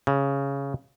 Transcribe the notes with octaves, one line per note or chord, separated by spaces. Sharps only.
C#3